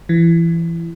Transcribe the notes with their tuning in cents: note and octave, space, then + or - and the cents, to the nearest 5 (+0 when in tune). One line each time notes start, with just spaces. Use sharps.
E3 +25